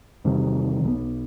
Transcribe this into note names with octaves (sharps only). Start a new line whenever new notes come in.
E2 C3 D#3 G3
B1 B2 F#3 B3